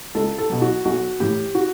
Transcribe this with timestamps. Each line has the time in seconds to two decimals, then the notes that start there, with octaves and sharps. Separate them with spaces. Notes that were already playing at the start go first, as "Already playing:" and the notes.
0.15 C#2 A4
0.38 A4
0.50 B2 F#3
0.62 F#4
0.85 B1 F#4
1.20 A2 E3 G4
1.55 F#4